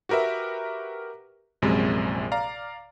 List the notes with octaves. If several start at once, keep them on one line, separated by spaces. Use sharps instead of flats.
F#4 G4 A#4 B4 E5
A#1 F#2 C3 G#3
D5 F5 A#5